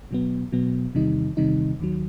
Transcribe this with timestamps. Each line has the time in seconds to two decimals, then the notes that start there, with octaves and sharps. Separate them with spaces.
0.11 B2 F#3 B3
0.52 B2 F#3 B3
0.95 E2 C3 D#3 G3 D#4
1.37 E2 C3 D#3 G3 D#4
1.80 D#2 D#3 F#3